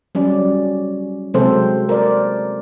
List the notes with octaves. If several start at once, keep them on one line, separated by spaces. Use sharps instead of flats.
F#3 G3 C#4 D5
C3 F#3 G#3 C4 A4 C5
A#4 C5 D5